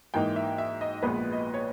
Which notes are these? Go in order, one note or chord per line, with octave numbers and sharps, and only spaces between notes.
G#2 E3 A#3 D#4 G5
E5
E5
D#5
A#1 A#2 G#3 B3 B4
D#5
C#5